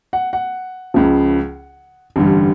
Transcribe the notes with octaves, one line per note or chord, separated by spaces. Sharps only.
F#5
F#5
C#2 C#3 F3
A1 G2 D3 G3